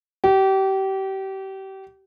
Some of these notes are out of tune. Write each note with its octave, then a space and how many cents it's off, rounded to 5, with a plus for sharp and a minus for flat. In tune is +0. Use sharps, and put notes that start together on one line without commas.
G4 -30